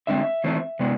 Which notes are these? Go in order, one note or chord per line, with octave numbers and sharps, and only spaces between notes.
D3 G#3 C4 E5
E3 A3 C4
C3 G#3 B3